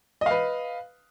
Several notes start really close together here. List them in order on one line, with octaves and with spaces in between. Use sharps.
D#5 F5 B4